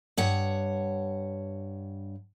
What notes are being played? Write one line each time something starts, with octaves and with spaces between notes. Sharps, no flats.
G2 C#5 F#5